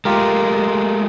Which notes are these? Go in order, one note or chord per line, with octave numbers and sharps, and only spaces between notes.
G#3 A3 F4 G4 A#4